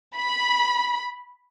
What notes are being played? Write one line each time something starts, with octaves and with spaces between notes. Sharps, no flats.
B5